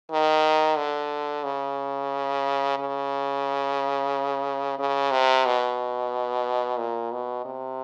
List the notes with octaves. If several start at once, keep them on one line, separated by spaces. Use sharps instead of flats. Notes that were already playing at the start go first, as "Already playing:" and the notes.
D#3
D3
C#3
C#3
C#3
C3
B2
A#2
B2
C3